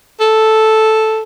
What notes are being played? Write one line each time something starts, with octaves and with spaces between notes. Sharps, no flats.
A4